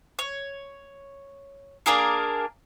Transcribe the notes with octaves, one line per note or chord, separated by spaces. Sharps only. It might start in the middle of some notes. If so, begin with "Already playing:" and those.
C#5
A#3 D4 G#4 A#4